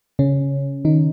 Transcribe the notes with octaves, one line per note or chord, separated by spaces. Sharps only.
C#3 C#4
D#3 D#4